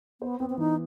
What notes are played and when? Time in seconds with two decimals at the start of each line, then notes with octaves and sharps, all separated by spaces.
0.21 B3 C5
0.39 B3 C4
0.50 C4
0.58 E3 D#4